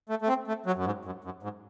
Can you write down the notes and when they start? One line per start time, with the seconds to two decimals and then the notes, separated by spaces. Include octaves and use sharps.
0.09 A3
0.22 A3
0.28 C4
0.47 A3
0.66 F#3
0.76 F#2
0.85 G#2
1.05 F#2
1.24 F#2
1.43 G#2